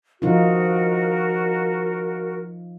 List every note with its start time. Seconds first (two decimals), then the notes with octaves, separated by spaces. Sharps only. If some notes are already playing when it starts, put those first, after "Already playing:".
0.22 F3 D#4 F4 F#4 A#4